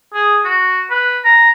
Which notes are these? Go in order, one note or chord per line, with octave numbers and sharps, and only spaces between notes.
G#4
F#4
B4
A#5